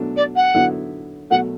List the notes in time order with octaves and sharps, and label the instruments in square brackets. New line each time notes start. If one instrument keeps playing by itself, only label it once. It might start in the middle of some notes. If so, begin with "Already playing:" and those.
Already playing: [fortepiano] B2 F#3 A3 D4
[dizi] D5
F#5
[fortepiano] D3 F#3 B3 E4
[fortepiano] B2 F#3 A3 [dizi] F#5